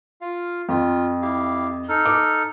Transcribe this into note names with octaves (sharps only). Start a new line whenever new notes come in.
F4 F5
F2 F4
E4 G4 F5
D#4 A4 F6
D6